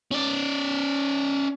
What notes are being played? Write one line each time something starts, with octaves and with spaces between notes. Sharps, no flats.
C#4 D5